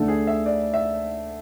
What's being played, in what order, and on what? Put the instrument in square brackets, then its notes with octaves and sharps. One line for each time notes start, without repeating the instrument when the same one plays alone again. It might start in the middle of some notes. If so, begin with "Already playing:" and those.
Already playing: [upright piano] D2 D3 A3 [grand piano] A4
[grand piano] G#4
E5
D5
E5